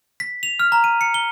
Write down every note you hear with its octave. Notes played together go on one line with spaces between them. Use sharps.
B6
F7
F6
A#5
D#7
C#7
G7